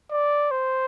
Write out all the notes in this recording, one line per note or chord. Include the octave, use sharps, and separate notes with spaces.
D5
C5